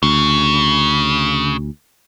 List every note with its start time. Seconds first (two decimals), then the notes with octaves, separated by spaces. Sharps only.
0.03 D2 C#3